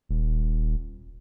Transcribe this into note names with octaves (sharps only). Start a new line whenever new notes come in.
D#1